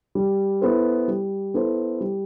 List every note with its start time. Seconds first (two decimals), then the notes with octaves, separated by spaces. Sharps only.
0.15 G3
0.62 B3 E4 A4 C5
1.08 G3
1.54 B3 E4 A4 C5
2.01 G3